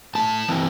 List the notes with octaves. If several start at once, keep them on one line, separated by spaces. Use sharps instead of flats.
A2 A5
E3 C4 E4